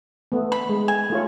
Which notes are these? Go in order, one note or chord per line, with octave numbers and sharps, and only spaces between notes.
A3 B3
B5
G#3
G#5
A3 F4 C#5